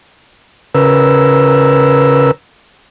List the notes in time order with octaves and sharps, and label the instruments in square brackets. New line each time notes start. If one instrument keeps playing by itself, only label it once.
[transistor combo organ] C#3 A#4 B4 E6